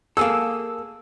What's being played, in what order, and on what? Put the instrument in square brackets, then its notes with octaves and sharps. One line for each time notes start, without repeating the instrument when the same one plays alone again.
[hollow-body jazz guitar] A#3 G#4 A4 [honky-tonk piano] E6